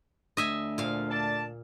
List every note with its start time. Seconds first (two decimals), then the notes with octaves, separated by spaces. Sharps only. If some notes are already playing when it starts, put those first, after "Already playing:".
0.37 D2 D#5 E5 G#5
0.78 A#2 F3 F5
1.09 D4 D5 A5